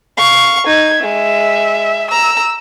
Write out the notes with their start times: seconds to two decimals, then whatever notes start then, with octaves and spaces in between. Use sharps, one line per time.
0.17 F5 C#6
0.66 D#4 G#6
1.02 G#3 E5
2.11 A#5 E6